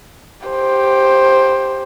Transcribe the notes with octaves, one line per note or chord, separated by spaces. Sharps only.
G4 C5